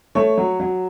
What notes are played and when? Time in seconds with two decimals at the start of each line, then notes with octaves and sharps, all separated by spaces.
0.15 A3 C#5
0.37 F#3
0.60 F#3